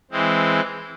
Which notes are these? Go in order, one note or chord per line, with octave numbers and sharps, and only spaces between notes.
E3 G#3 C4